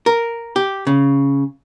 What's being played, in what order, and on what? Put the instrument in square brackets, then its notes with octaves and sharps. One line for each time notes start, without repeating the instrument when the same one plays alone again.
[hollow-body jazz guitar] A#4
G4
C#3